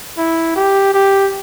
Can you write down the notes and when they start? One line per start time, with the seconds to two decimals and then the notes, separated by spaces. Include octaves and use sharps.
0.17 E4
0.56 G4
0.94 G4